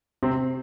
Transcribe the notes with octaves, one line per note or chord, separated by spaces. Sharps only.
C3 C4